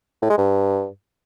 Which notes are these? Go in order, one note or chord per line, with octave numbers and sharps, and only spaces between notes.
A2
G#3
G2